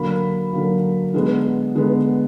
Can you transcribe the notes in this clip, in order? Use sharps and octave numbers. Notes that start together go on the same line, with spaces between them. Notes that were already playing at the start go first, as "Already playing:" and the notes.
Already playing: D3 F#3 A#3 B5
D3 F#3 A#3
D3 G#3 B3
D3 G#3 B3